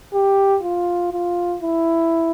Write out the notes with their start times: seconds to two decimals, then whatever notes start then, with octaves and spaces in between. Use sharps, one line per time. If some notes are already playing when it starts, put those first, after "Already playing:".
0.14 G4
0.64 F4
1.12 F4
1.62 E4